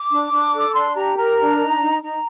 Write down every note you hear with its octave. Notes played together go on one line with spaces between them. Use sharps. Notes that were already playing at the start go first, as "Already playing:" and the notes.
Already playing: D6
D4
D4
A4
D4 C6
G4 A#5
A#4 A#5
D4
D#4
D#4
D#4 A#5